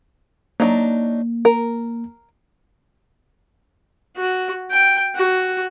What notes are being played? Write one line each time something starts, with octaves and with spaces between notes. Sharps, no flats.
F#3 A#3 D4 D#4
A#4
F#4
G5
F#4